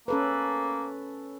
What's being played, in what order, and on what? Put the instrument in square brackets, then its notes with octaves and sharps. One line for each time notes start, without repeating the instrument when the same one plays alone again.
[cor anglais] A#3 [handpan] C#4 A4 B4